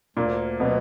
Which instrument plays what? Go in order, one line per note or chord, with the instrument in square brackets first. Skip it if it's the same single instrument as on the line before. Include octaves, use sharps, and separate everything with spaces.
[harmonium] D2 [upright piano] A#2 A#3
[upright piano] B2 B3 [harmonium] F#3